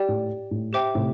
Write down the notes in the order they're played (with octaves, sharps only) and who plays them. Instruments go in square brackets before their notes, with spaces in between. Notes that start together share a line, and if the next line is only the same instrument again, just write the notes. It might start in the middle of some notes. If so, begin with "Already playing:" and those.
Already playing: [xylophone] G4 D5 G5
[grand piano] A2
A2
[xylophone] G4 C5 E5 G5 D6
[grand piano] A2 C3